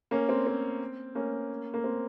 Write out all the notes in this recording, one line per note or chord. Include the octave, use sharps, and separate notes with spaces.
A#3 C#4
C4
C4
A#3 C#4
A#3
C4